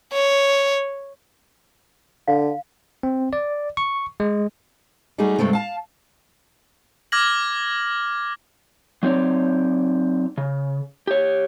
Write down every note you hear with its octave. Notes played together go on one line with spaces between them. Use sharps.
C#5
D3 F5
C4
D5
C#6
G#3
G3 A3 D#4 F#4 G#4
G2 C3 G#3 A3 C4
F5 A5
D6 F6 G#6 A#6 F#7
F#3 C4 D#4 C#5 D5
C#3
G4 C#5